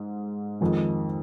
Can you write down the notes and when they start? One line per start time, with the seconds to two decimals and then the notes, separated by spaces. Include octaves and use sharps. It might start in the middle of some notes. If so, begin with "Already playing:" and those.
Already playing: G#2 G#3
0.61 F2 D#3 G#3